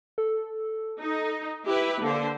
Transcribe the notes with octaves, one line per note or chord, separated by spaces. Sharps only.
A4
D#4
E4 G4 B4
D3 A#3 C5